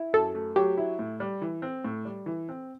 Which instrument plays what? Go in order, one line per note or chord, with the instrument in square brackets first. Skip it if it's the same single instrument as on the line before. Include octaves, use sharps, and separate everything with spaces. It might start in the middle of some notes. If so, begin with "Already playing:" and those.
Already playing: [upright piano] E4
[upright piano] F#2 [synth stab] A4
[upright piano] A3
[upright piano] F#3 [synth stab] G4
[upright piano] E4
A2
G3
E3
C4
A2
G3
E3
C4